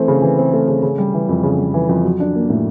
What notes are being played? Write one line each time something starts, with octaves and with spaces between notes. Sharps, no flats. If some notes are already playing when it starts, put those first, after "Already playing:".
Already playing: E3 A3 C4
C#3
E3
C4
A3
C#3
C#3
G3
E3
F2
C#3
G3
E3
F2
F#3
D4
A#3
A2